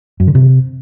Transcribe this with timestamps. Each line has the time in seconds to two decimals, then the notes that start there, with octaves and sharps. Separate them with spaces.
0.20 F#2
0.27 D3
0.35 C3